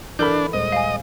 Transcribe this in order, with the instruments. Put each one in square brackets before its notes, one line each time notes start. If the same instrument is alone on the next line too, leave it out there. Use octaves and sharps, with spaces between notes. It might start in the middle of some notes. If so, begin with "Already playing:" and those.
[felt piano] E3 B5 [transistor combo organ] D4 [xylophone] A4 A#4 G6
[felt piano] D#1 G#3 C5 [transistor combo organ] D#5
[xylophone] F5 G#5